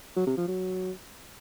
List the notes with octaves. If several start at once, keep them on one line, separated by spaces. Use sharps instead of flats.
F#3
C3
F3
F#3